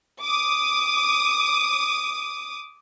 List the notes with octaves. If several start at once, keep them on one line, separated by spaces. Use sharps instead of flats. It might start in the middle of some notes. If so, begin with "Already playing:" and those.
D6 D#6